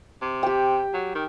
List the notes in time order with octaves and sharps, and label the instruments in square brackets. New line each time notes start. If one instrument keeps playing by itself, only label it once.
[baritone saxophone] C3
[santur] G4 G5
[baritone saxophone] F#3
D#3